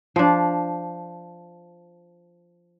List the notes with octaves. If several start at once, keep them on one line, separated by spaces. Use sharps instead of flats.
F3 D4